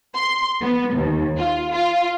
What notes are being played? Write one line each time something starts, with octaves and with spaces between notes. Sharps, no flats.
C6
B3
D#2
F4
F4